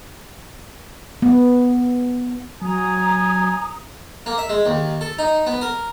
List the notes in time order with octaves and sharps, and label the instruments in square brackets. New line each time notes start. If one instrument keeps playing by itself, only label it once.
[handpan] B3
[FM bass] F#3 [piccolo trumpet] G#5 [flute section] A#5 D#6
[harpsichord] A#3
E5
G#3
D#2
A4
D#4
B3
A#4